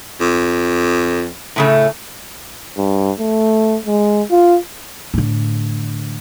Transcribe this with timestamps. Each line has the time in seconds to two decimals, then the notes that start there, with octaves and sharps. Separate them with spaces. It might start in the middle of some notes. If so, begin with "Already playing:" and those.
0.21 F2
1.56 A2 C#3 A3
2.78 G2
3.19 A3
3.86 G#3
4.31 F4
5.14 A2 D3